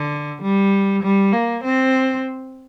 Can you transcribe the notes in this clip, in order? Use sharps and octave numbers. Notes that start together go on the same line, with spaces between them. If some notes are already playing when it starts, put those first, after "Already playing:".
Already playing: D3
G3
G3
A#3
C4